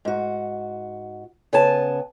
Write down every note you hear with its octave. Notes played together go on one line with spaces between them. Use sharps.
G#2 F#4
C#3 B3 G#5 A5